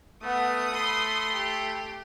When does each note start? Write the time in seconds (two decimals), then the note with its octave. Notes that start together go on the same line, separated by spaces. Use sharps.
0.24 A3 B3 F#5 D#6
0.73 B5 C6
1.33 G4